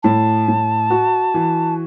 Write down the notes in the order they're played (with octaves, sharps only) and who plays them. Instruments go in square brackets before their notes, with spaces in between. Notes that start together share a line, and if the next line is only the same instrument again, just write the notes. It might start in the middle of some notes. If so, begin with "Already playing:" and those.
[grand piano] A2 [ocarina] A5
[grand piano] A2
F#4
E3